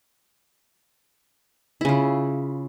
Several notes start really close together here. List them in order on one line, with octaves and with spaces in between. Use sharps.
E4 C#3 F4